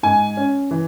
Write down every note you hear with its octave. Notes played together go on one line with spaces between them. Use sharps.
G#2 G#5
C#4
E3